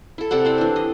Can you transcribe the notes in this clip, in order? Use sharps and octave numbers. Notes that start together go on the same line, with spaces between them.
E4 A4
C3 A4 D5 F#5
C4 C5 D5
E3 D4
D#5